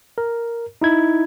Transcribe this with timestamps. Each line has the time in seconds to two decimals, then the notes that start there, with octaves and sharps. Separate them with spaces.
0.18 A#4
0.82 D#4 E4 G#6